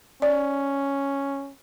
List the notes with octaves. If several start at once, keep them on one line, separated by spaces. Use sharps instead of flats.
C#4 D5